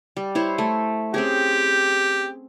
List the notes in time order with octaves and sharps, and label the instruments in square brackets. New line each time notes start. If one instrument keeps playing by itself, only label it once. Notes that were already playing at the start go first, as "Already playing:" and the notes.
[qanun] G3
E4 C5 C#5
A3
[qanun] C4 C#4 G#4 [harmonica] G4